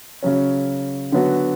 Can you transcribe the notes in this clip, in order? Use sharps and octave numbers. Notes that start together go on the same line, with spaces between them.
C#3 F#3 C#4
D3 F#3 B3 F#4